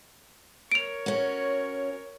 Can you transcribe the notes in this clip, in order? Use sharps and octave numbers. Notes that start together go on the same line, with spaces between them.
A#4 C#5 D7 F7
C#4 F#4